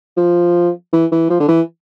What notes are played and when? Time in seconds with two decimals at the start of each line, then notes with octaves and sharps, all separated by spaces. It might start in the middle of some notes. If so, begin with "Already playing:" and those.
0.17 F3
0.93 E3
1.12 E3
1.30 F3
1.40 D3
1.48 E3